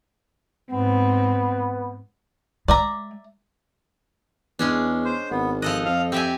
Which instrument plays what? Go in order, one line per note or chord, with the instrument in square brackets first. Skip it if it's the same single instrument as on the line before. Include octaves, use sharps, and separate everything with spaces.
[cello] G#2 C4 [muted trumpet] B3
[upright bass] G#3 [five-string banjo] D5 E5 A#5
[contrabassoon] E2 [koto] G#3 C#4 D4
[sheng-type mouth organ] C5
[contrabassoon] G#1 [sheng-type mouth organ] B3
[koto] F3 A4 D#5 [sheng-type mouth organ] F#6
[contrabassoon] F2 [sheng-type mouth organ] F5
[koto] C4 E5 G#5 [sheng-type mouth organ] G4